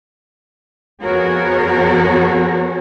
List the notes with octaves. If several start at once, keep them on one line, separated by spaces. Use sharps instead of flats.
F2 B3 F#4 G#4 A#4 C#5